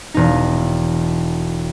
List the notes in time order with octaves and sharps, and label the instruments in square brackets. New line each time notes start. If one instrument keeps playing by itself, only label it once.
[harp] E1 D#4